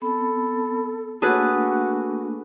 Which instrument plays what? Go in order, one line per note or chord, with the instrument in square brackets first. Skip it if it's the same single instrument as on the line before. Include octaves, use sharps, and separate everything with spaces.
[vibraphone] B3 C4 B5 [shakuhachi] A4
[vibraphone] A3 A#3 D4 [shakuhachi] F#4 [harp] G#4 A4 B4